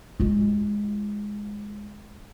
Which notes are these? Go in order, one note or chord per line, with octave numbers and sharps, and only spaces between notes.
G#3 F4